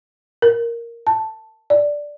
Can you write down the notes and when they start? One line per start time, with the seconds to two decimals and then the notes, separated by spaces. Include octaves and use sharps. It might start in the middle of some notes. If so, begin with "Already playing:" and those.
0.42 A#4
1.07 A5
1.70 D5